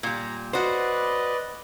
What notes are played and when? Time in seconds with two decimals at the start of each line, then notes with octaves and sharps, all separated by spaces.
0.03 A#2 G3 A#5
0.53 F#4 B4 C5 D5 D#5